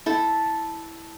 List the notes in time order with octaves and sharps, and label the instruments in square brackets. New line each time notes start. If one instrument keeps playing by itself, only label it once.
[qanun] E4 A4